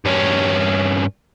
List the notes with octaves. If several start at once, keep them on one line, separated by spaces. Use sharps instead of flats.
G2 C#4